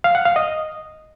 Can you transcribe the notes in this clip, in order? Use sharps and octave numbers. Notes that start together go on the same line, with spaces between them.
F5
F#5
F5
D#5